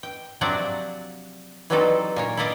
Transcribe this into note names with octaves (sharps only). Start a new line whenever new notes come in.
G5
C3 F3 F#3 D4 F#4 D5
E3 F#3 G3 C4 D#4 A4
A#2 A#4 C#5
E4 A4 A#4 D5 D#5 F5